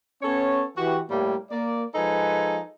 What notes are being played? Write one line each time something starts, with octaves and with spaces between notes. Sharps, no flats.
B3 C#4 A4 C#5
E3 F#4 G4
A2 G3 A#3
A#3 D5
F3 G#3 D#4 A4 B4 G#5